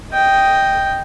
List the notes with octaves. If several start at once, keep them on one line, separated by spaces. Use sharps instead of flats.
D#5 G5